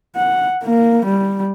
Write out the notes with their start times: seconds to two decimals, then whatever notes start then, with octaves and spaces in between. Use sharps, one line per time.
0.16 F#5
0.64 A#3
1.06 G3